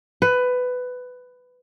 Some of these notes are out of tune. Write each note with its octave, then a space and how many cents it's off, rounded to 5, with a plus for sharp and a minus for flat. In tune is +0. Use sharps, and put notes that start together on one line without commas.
B4 +15